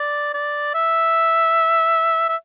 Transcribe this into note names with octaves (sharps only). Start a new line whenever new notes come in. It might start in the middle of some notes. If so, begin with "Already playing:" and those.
Already playing: D5
D5
E5
E5